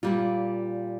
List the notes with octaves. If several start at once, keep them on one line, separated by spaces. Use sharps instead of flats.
A#2 G3 A#3 F4